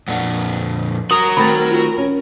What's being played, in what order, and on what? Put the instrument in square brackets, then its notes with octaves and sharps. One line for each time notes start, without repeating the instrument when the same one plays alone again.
[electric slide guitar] F2 A#2 D4 [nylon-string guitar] F#5
[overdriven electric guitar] F#4 A#5 [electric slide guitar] A#4 [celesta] D#6
[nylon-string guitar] D#3 A3 C4 [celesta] B5 A6
[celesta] F4
[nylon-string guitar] C#4